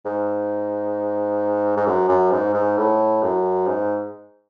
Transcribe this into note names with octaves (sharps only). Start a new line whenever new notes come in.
G#2
G#2
F#2
F#2
G#2
G#2
A2
F#2
G#2